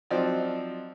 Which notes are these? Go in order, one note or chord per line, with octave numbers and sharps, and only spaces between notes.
F3 F#3 C4 D#4 D5